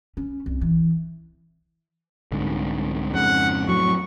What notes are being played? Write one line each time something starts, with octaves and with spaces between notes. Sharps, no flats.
C#4
C2
E3
C2 G#2 D3
F2 G#2 C#3 F#5
F2 A2 F#3 C#6